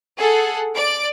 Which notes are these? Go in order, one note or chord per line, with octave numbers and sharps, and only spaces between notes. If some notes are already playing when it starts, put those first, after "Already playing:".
G#4 A4 F#5
D5 D7